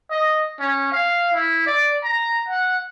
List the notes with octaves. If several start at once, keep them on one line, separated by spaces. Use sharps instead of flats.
D#5
C#4
F5
E4
D5
A#5
F#5